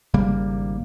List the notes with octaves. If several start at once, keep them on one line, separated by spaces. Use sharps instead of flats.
G#1 C#3 G3 A#3